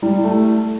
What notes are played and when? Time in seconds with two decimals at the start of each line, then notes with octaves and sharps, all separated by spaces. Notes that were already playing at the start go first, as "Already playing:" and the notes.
0.02 G3 E4
0.24 A3